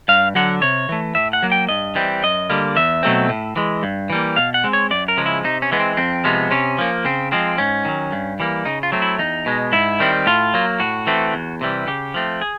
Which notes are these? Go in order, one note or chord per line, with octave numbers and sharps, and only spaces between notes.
G2 F5
D3 F#3 F#5
C3 C#5
E3 A3
A2 E5
F#5
F#3 A#3
G5
G2 D#5
E3 G3 C4
F#2 D#5
D3 G3 A#3
E2 E5
B2 F#3 A3 C4
A2
E3 G#3
G2
E3 G3 A#3
B2 F5
F#5
G#3 C4
C#5
F#2 D5
A#4
C#3 F3 G#3
E4
C3 D#4
C#4
E3 G#3 B3
C4
F2 C4
C3 F3 G#3 B3
C3 C#4
F3 A#3
C#3 C4
F3 G#3 C4
G#2 C#4
D#3 F#3
G2
E3 G3 A#3
C#3 D#4
F4
F#3 A3 C4
E4
E2 D#4
B2 G#3
G#2 E4
D#3 G3 C4
A2 F4
F#3 A#3
A2 F#4
E3 A3 C4
E2
C3 E3 G3
C#3 G4
F3 A3 C4
G#4